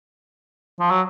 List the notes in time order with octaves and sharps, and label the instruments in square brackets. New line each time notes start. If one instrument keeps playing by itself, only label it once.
[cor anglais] F3
F#3